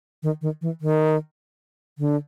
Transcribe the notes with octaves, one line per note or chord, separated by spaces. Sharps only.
D#3
D#3
E3
D#3
D3